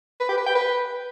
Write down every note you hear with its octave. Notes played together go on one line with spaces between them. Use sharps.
B4
G4
B4
G5
B4